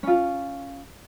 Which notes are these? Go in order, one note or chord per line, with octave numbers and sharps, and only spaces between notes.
C#4 F4